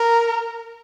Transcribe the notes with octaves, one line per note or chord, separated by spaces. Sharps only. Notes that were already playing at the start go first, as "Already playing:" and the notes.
Already playing: A#4